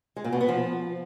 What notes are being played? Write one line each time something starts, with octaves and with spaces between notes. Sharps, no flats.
G#3
A#2
B2
B3
F3